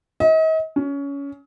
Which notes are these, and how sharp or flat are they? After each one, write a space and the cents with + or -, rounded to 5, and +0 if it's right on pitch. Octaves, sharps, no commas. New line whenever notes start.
D#5 +40
C#4 +20